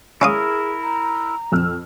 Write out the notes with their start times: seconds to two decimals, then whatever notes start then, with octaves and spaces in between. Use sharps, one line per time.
0.21 C#4 E4 G#4 A#4 F5 D#6
0.81 A#5
1.52 F2 E6 F6